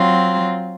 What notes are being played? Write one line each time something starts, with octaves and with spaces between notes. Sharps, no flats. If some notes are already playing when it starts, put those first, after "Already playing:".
Already playing: F#3 C4 F4